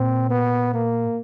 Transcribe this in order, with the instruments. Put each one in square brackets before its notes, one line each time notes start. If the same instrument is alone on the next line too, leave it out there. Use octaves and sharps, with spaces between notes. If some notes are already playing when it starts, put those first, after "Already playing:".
Already playing: [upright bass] A#2 [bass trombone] C4
[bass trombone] B3
A#3